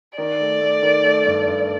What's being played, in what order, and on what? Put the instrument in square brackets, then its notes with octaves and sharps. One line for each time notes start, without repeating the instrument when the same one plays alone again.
[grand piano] D#3 [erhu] D5
[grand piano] A3
A3
D#3
A3
G2
G2